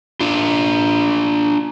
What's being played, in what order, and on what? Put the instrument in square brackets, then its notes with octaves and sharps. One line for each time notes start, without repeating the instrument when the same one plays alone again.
[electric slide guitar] D4 F4